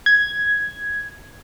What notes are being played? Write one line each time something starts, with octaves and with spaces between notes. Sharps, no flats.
G#6